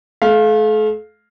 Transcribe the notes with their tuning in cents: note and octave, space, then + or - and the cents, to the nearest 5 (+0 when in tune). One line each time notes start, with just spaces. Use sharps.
A3 -40 F5 +0